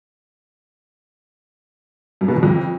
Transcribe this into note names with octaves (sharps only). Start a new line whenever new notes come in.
F#2
B2
E2
F2